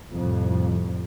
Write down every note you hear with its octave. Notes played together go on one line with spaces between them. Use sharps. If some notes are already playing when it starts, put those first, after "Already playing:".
C2 F2 A2